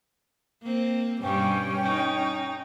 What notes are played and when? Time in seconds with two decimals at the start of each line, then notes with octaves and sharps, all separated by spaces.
0.62 A#3 C4
1.21 G2 B2 G3 C#4 G5
1.84 D#4